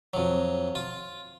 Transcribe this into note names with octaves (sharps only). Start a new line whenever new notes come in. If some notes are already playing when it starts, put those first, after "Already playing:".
F2 F#3
F4